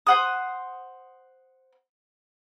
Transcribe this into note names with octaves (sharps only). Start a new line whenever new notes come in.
C5 F#5 D#6